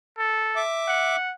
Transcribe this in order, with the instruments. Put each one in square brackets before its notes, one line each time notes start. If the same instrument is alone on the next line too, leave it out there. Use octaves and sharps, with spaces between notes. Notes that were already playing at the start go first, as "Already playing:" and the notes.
[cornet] A4
[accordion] E5 D6
[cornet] F#5